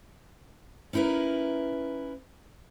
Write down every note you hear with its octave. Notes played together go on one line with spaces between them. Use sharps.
C#4 D#4 E4 A#4 B4